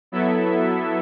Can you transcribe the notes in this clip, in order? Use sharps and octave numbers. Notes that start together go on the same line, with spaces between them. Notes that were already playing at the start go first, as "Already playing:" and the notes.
F#3 B3 E4 A4 E5